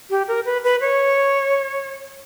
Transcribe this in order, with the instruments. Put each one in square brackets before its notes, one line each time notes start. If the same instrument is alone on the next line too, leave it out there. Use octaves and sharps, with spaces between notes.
[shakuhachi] G4
A#4
B4
B4
C#5